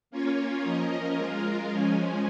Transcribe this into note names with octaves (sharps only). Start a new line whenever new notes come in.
A#3 C#4 F4 C#5
F3 C#4 A#4 D#5
G#3 F4 A#4
F3 G#3 C#4 G#4